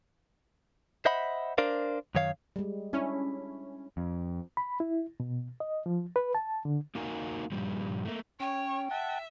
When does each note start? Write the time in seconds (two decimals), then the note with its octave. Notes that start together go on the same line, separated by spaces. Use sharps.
1.06 C5 D#5 E5 F#5 B5
1.58 D4 A#4 C5 D5 F5
2.15 F#2 D#3 C#5 F5
2.56 G3 G#3
2.93 C#4 D4 E4
3.97 F2
4.57 B5
4.80 E4
5.20 B2
5.60 D#5
5.86 F3
6.16 B4
6.35 A5
6.65 D3
6.95 A#3 D#4 F#4 A#4 F5 G#5
7.52 G2 A#2 F3 G3
8.05 A3 A#3
8.40 C#4 C#5 G5
8.91 E5 F#5 A5